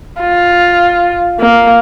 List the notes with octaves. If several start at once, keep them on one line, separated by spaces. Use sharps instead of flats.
F4
A#3